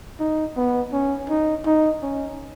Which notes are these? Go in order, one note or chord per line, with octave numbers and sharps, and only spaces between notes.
D#4
B3
C#4
D#4
D#4
C#4